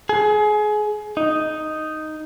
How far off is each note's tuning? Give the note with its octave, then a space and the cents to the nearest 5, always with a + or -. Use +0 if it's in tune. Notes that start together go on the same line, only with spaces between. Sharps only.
G#4 +25
D#4 +0